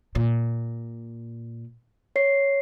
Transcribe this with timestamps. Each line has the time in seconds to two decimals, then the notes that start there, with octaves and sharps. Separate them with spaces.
0.15 A#2
2.16 C#5 C7